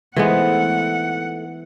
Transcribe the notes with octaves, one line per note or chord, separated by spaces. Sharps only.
E3 G#3 A3 B3 C4 D#4 F#5